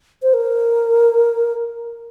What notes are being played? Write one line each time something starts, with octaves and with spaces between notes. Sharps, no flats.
C5
A#4